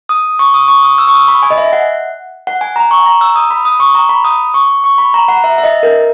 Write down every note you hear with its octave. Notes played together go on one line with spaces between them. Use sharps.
D#6
C#6
D#6
C#6
D#6
E6
C#6
D#6
B5
G#5
D#5
E5
F#5
F#5
G#5
A#5
C#6
A#5
E6
D#6
B5
D#6
C#6
A#5
B5
D#6
C#6
C#6
B5
A#5
F#5
E5
E5
D#5
A#4